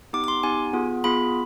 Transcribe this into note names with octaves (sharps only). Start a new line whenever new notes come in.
B3 D#4 G4 D6
D6
C6
B3 D#4 G4 G#5
B3 F4 G#4
B3 F4 G#4 B5